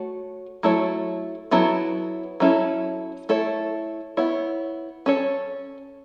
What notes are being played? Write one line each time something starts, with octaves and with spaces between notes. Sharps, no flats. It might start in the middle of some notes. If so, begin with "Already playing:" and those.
Already playing: A3 F#4 C#5
F#3 A3 E4 A4 C#5
F#3 B3 E4 A4 C#5
F#3 C#4 E4 A4
A3 E4 A4 C#5
B3 E4 C#5
C#4 A4 C#5